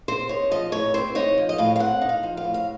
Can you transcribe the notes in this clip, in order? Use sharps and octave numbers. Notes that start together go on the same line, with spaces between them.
C4 C5
D#4 C#5
F3 D#5
A2 C#5
C4 C5
D#4 C#5
F3
D#5
A2 F5
F5
C4 F#5
D#4
F5
F3
F5
A2
F5